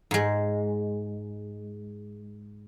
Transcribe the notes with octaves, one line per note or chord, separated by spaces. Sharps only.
G#2 G#3